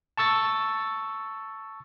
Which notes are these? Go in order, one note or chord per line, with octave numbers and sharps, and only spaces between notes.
A5 C#6 E6 A6